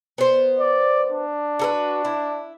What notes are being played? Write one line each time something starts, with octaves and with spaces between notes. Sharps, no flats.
B3 C5
D5
D4
F#4 A4 B4
E4